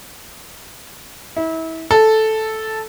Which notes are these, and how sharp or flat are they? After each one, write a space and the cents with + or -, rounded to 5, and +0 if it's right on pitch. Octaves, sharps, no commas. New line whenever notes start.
E4 -30
A4 -5